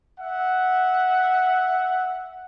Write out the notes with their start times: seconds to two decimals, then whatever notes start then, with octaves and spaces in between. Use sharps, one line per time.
0.19 E5 F#5